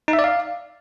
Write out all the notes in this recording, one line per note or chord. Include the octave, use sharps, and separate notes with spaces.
D#4
E5
D5
F5